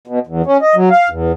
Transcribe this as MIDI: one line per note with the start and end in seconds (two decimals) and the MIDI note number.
0.08 0.19 47
0.27 0.42 40
0.46 0.57 61
0.62 0.75 75
0.76 0.89 54
0.91 1.09 77
1.10 1.32 40